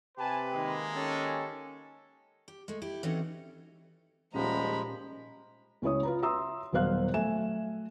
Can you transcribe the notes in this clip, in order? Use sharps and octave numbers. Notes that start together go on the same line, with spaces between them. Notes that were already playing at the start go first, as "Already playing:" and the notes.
C3 G4 B4 G#5 A5
D#3 G#3 A#3
C#4 G4 A4
G4
G#3 A3
E4 G4
E3 C4 C#4 D#4 F#4 A4
D#1 A#2 F3 G#3 C#4 G4 A#5 B5
C#2 C#4 E4 C#5 D#6
F4 B4 A#5
E5 A#5 C6 D#6 E6
D#1 B2 F#3 C5 F5 F#6
F#3 A3 E5 G#5 E7